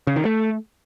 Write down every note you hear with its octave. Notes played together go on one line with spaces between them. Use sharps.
C#3
D#3
A3